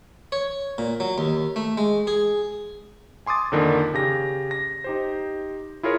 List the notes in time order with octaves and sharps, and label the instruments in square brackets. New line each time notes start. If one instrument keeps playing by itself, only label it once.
[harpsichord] C#5
A#2
F#3
D#2
A3
G#3
G#4
[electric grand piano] G#5 C6 D6 D#6 A6
F2 D3 D#3 A#3
C#3 G4 A#6
A#6
D#4 G4 C5
E4 F4 G#4 A#4 C#5